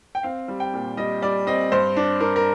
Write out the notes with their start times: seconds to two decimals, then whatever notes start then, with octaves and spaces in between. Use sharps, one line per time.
0.15 G5
0.23 C4 F5
0.48 G3
0.60 G5
0.74 A#2
0.97 G3 D#5
1.22 G3 D5
1.47 C4 D#5
1.72 G2 C5
1.97 D4
2.20 D4 A#4
2.36 A#4